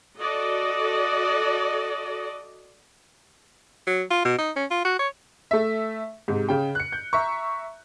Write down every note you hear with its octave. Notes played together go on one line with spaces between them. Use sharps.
F#4 A4 D5 D#5
F#3
F4
B2
D#4
C#4
F4
F#4
C#5
A3 E5
G#2 C3
C#3 G5
F#6 C#7
G6
E5 A#5 C#6